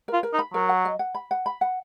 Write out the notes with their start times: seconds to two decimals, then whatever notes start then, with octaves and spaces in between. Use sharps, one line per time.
0.08 F4 A#4
0.23 A#4
0.33 D#4
0.39 B5
0.53 F#3 A#4
0.69 F#5
0.85 D#5
0.99 F#5
1.15 B5
1.31 F#5
1.46 B5
1.61 F#5